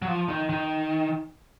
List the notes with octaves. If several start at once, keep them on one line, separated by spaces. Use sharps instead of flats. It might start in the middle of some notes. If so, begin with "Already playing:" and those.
F#3
F3
D#3
D#3